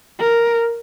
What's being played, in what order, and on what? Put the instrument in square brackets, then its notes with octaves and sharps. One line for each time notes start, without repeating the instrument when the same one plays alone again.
[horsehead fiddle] A#4